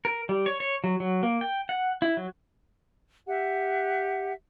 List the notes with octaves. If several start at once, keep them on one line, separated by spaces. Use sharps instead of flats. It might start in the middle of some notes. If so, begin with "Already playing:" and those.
A#4
G3
C#5
C#5
F#3
F#3
A#3
G5
F#5
E4
F#3
G4 E5 F#5